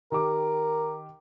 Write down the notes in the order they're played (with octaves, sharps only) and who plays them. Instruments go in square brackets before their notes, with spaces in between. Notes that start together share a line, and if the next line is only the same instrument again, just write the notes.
[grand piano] D#3 G4 D6 [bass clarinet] A#4